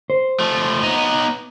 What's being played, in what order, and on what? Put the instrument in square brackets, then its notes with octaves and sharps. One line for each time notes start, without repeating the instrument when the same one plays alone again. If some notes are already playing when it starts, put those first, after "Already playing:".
[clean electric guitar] C5
[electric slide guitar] F3 A3
B3 D#4